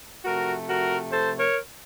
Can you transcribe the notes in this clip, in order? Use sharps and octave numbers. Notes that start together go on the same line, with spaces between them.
C3 F3 A3 F#4 A#4
F#4 A#4
A4 C5
A#4 C#5